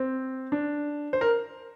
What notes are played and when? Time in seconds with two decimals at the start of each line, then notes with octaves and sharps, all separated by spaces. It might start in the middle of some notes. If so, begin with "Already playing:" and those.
Already playing: C4
0.52 D4
1.13 C5
1.21 A#4